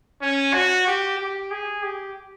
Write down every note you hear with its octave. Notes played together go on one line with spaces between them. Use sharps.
C#4
F#4
G4
G4
G#4
G4